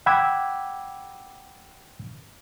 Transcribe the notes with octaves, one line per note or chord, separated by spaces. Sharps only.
F#5 G5 B5 D6 E6 G#6